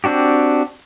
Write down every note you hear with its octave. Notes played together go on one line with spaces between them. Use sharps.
C4 D4 F#4 G4